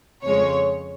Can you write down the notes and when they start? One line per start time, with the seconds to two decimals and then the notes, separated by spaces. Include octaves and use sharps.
0.23 F2 C#3 F3 G#3 C#5